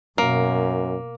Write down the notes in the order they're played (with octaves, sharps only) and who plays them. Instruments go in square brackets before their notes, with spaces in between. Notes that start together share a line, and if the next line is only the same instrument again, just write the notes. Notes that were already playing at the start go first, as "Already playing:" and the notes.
[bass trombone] F#2 [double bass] B2 [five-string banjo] A#3